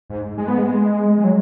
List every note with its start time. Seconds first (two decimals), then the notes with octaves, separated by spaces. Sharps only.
0.10 G#2
0.38 G#3
0.48 B3
0.58 G#3
1.18 G#3
1.24 F#3